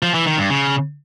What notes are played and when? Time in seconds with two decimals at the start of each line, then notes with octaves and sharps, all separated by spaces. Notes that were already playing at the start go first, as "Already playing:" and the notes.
0.03 F3
0.14 E3
0.26 D#3
0.38 G2
0.50 C#3